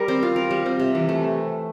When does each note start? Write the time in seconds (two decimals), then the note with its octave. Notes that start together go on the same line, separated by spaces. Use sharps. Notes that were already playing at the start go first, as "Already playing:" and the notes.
Already playing: G3 A#4
0.08 C4
0.23 F4
0.36 A#4
0.51 G3
0.66 C4
0.80 C3
0.95 E3
1.09 A3